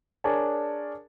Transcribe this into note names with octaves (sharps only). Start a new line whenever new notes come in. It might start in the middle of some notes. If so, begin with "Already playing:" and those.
D4 G#4 A#4 C#5 G#5 A5